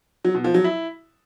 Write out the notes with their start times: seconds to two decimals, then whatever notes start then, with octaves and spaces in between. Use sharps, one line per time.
0.25 F#3
0.34 B2
0.44 F3
0.54 F#3
0.64 E4